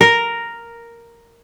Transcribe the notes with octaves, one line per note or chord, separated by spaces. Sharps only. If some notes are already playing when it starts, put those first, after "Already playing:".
A#4